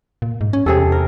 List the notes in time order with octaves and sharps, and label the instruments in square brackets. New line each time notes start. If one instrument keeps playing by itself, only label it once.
[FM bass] A#2
G#2
C#4
[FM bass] E2 [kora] C3 G#4 A4
[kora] A#4